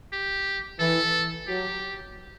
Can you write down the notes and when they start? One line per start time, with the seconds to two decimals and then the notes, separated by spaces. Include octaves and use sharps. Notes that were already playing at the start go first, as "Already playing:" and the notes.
0.13 G4
0.79 E3 A4
1.48 F#3 G4